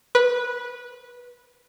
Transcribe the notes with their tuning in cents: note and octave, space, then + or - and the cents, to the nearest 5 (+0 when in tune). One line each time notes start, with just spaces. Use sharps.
B4 -15